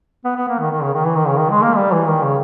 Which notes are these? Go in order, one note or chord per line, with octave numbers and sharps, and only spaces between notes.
B3
B3
A#3
D#3
D#3
C#3
D#3
E3
D#3
C#3
D#3
G#3
A#3
G3
E3
D#3
C#3